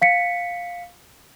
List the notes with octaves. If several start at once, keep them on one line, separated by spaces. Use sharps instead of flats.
F5 B6 C#7